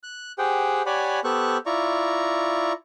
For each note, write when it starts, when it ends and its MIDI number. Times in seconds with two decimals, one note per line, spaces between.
0.03 0.32 90
0.38 0.82 67
0.38 0.82 68
0.38 0.82 72
0.38 0.82 78
0.38 0.82 79
0.86 1.20 67
0.86 1.20 73
0.86 1.20 74
0.86 1.20 78
0.86 1.20 80
0.86 1.20 83
1.24 1.57 59
1.24 1.57 67
1.24 1.57 69
1.24 1.57 72
1.24 1.57 85
1.24 1.57 90
1.66 2.73 64
1.66 2.73 65
1.66 2.73 74
1.66 2.73 82
1.66 2.73 85